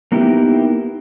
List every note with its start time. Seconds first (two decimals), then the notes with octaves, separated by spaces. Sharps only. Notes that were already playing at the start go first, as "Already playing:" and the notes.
0.12 A#3 B3 D#4 E4 G4